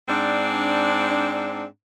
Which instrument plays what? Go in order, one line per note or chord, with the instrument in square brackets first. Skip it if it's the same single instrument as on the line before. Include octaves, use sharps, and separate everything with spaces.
[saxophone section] G#2 C4 D4